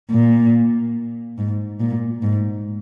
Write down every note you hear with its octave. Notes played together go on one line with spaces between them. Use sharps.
A#2
G#2
A#2
G#2